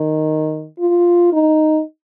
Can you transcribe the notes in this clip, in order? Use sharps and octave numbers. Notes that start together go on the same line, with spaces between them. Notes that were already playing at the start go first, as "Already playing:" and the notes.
Already playing: D#3
F4
D#4